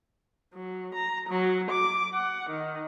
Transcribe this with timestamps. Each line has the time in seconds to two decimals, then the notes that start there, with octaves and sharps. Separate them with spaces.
0.54 F#3
0.94 A#5
1.29 F#3
1.71 D6
2.13 F#5
2.49 D#3